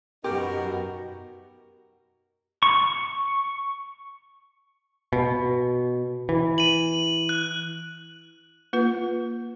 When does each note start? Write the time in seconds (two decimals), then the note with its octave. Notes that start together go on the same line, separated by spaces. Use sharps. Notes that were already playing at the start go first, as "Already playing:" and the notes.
0.24 F#2 B2 B3 D#4 F#4 G4 A#4
2.63 C#6
5.13 B2
6.29 E3
6.58 D#7 F#7
7.29 F#6
8.73 A#3 F4 B4